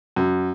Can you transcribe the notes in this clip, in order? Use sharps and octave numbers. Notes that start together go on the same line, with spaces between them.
F#2